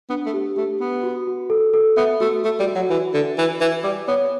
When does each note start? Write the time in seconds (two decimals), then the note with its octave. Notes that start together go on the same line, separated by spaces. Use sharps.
0.09 B3 D4
0.26 A3
0.34 G4
0.56 A3 G4
0.80 B3 B4
1.03 F#4
1.27 F#4
1.50 A4
1.74 A4
1.97 B3 E5
2.21 A3 F#4
2.43 A3 F#4
2.59 G3
2.67 F#4
2.75 F#3
2.90 E3 F#4
3.13 D3 E5
3.37 E3 E5
3.60 E3 E5
3.84 G3 D6
4.08 B3 C#5